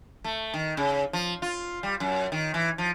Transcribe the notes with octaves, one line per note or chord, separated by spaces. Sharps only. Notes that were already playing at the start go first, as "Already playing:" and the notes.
A3
D#3
C#3
F3
F4
G3
F#2
D#3
E3
F3